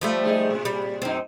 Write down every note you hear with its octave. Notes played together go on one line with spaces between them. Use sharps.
F3 G3 A3
G#3 D#4 G#4
A2 C3
G3
F#2 B2 C4 D#4